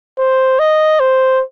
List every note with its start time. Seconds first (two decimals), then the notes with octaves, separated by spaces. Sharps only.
0.19 C5
0.59 D#5
1.00 C5